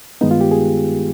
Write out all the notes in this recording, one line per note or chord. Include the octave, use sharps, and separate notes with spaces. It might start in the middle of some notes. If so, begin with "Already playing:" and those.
G2 D#3 G#3 B3 D#4
F4
G4
G#4